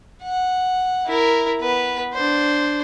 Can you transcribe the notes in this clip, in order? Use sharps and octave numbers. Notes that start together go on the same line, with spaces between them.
F#5
E4 A#4
B3 B4
D4 C5